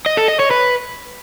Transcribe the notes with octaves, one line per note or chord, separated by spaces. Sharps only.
D#5
A4
D#5
C#5
B4